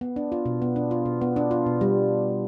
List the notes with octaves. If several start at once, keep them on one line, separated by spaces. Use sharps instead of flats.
B3
D4
F4
B2
B3
D4
F4
B2
B3
D4
F4
B2
G3